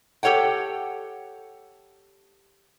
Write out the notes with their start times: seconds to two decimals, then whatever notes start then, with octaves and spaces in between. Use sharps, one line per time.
0.23 G4 A4 C#5 F#5 G5